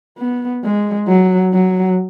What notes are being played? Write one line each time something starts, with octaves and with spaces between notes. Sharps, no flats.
B3
G#3
F#3
F#3